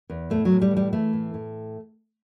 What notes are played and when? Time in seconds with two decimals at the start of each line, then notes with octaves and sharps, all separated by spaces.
0.10 E2
0.30 A2 A3
0.45 F#3
0.51 A2
0.62 G3
0.71 E3
0.77 G3
0.93 E3 A3
1.13 A2
1.34 A2